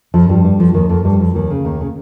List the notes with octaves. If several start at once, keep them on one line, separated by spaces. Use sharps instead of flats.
F2 F3
G2 G3
G2 G3
F2 F3
D#2 D#3
F2 F3
G2 G3
F2 F3
D#2 D#3
C#3
D#2 D#3
C#3